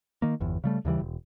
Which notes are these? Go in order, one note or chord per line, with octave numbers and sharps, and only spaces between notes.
D#3 A#3
G1 E2
C#3 G3 A3
D#2 C#3 E3 G3
E1